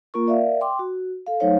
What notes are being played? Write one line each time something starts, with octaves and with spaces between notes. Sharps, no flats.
A#3 F4 A#4 C#6
A#4 D5 E5 F5
G5 C6 D6
F#4
A4 F5
F#3 A3 D#4 C5 C#5 F5